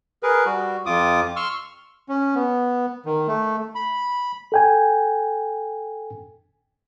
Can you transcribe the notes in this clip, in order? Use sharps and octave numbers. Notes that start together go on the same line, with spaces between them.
G#4 A#4 B4
G3 F#4
F2 F4 D6 D#6
C6 C#6 E6 F6
C#4
B3
D#3
A3
B5
A4 G5 G#5